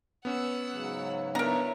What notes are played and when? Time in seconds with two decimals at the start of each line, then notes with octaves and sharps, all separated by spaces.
0.25 B3 C#4 F#5 E6
0.72 G#2 C#3 F#3
1.35 B3 D4 E4 A#4 C#5 A#5